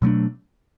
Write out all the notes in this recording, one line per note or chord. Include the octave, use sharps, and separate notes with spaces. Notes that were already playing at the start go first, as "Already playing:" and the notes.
B2 F#3 A3 D4